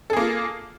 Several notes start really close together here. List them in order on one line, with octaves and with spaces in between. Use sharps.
A4 G#4 A#3 F4